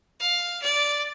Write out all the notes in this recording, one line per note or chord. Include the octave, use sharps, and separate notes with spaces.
F5
D5